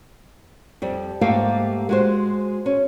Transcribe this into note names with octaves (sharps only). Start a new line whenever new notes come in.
F2 G3
G#2 A3 A#3 G4 F5
G#3 F#4 C5
C#4